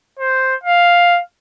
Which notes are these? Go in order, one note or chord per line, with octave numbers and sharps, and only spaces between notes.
C5
F5